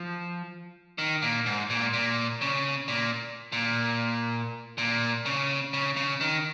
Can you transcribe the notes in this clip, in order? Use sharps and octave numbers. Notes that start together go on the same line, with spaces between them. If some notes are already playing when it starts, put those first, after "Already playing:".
Already playing: F3
D#3
A#2
G#2
A#2
A#2
C#3
A#2
A#2
A#2
C#3
C#3
C#3
D#3